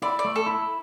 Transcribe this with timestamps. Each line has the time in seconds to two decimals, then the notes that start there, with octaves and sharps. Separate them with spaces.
0.02 E4 D5
0.19 D5
0.25 A3
0.36 A4
0.46 E4